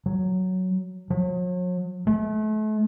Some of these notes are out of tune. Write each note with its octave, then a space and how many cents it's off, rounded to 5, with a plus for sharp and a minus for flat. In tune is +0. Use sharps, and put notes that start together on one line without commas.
F#3 +5
F#3 -40
A3 -35